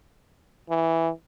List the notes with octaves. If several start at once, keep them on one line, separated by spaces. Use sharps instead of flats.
E3